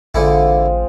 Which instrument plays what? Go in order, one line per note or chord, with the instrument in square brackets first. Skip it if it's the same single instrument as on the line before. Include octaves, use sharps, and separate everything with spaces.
[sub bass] A1 [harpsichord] D3 E4 [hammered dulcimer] G#3 C4 F4